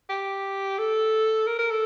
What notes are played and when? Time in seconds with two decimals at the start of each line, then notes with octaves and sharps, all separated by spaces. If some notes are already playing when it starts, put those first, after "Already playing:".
0.09 G4
0.78 A4
1.47 A#4
1.59 A#4
1.71 A4